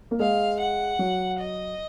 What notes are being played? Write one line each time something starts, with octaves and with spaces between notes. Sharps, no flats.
A#3
G#3 F5
F#5
F#3
D#5